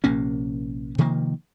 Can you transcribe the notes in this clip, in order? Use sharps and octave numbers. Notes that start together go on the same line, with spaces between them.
A#1 C3 A#3 C#4
C3 D#3 F3 A#3